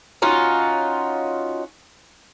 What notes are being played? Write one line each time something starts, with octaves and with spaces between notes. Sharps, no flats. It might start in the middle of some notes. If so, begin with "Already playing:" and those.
C#4 D#4 F4 F#4